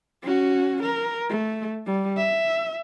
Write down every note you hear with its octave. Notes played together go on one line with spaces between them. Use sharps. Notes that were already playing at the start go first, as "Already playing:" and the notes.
C#4 F#4
A#4
A3
G3
E5